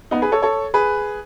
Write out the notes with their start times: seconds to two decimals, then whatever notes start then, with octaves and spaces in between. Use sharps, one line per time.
0.11 B3 D#4
0.22 G#4 B4
0.32 A4 C#5
0.42 A4 C#5
0.74 G#4 B4